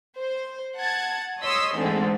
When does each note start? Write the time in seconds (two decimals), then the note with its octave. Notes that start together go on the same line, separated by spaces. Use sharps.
0.16 C5
0.76 F#5 A5 G#6 A6
1.42 C#5 D#5 C6 D#6 E6 B6
1.77 G#2 D3 E3 G#3 A3 C4